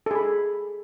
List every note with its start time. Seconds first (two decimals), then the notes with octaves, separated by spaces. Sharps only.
0.06 A4
0.11 G#4
0.15 B5